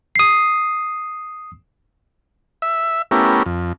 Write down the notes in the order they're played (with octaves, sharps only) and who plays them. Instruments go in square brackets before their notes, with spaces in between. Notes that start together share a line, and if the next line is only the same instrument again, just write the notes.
[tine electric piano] D#6 C7
[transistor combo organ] E5
A3 B3 C#4 E4 G4 A#4
F2